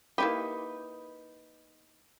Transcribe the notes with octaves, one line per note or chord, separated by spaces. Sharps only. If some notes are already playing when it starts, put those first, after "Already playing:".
A#3 D#4 E4 G4 B4